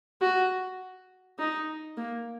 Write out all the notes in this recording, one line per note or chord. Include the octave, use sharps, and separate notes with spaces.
F#4
D#4
A#3